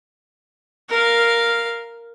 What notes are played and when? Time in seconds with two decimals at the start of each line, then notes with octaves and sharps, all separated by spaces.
0.89 A#4 F5